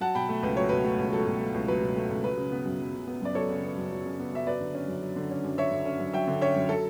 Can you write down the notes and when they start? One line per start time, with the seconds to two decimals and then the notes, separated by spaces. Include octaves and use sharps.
0.01 F#3 F#5 A5
0.15 B2 G5 B5
0.29 A3
0.43 C#2 B4
0.57 F#3 C#5
0.69 B2 B4
0.84 A3
0.98 C#2
1.12 F#3 A4
1.26 B2
1.41 A3
1.54 C#2
1.68 F#3 B4
1.82 B2
1.96 A3
2.10 C#2
2.24 F#3 B4
2.37 C#3
2.52 B3
2.66 F#2
2.80 F#3
2.94 C#3
3.08 B3
3.21 F#2 D5
3.35 F#3 A4 C#5
3.49 C#3
3.63 B3
3.78 F#2
3.92 F#3
4.05 C#3
4.19 B3
4.32 F#2 E5
4.47 F#3 B4 D5
4.61 D3
4.75 C#4
4.88 F#2
5.02 F#3
5.16 D3
5.31 C#4
5.44 F#2
5.58 F#3 C#5 E5
5.72 D3
5.86 C#4
6.00 F#2
6.13 F#3 E5 G5
6.28 D3
6.41 C#4 C#5 E5
6.56 F#2
6.69 F#3 A4